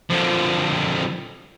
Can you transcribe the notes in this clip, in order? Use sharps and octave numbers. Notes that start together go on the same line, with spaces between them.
D3 F3